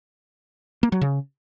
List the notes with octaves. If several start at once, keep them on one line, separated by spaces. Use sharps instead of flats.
A#3
F#3
C#3